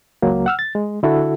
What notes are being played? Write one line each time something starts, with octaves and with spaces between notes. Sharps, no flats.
C#2 F#3 A#3
F#5 E6 F6
A6
G#3
D3 E4 F#4 A4